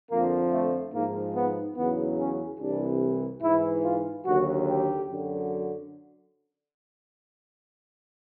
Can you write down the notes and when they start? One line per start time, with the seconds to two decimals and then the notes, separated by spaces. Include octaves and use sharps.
0.11 F2 D3 F3 A#3
0.53 A3
0.94 G#2 F3 A#3
1.35 B3
1.77 E2 C#3 F#3 B3
2.19 C#4
2.60 C2 C3 E3 D4
3.43 G#2 E3 E4
3.84 F4
4.26 D#2 D3 F#3 F#4
4.67 G4
5.08 F#2 D3 F#3